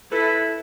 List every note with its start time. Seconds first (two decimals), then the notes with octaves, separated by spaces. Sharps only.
0.12 E4 A4 B4